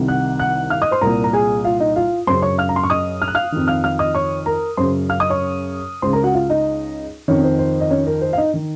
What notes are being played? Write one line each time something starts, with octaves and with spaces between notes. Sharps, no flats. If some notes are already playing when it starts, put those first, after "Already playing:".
Already playing: C2 C3 D#3
F#5 F#6
F#5 F#6
F5 F6
D#5 D#6
C5 C6
C2 A#2 A#4 A#5
A#5
G#4 G#5
F4 F5
D#4 D#5
F4 F5
F#2 C#3 C5 C6
C#5 C#6
F5 F6
A#5
C6
C#6
D#5 D#6
F6
F#6
F5 F6
F2 D#3
F5 F6
F5 F6
D#5 D#6
C#5 C#6
A#4 A#5
F#2 C#3 C5 C6
F5 F6
D#5 D#6
C#5 C#6
C#2 C#3 C5 C6
A#4 A#5
F#4 F#5
F4 F5
D#4 D#5
F2 D#3 C#4 C#5
C5
C5
D#5
C#4 C#5
A#4
C5
F5
D#4 D#5
D#3